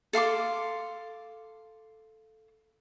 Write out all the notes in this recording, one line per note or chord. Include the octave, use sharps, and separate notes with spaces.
A4 F5 C6 D6